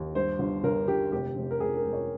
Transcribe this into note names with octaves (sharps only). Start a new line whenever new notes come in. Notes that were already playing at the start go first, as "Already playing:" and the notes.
Already playing: D#2
G2 C5
G1
G1 A#4
G1 G4
F1 G4
F1
A#4
F1 G#4
A#4
F1
C#5